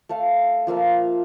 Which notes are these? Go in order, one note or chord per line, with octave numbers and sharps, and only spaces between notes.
A3 A4 F5
F3 A#3 E5 F5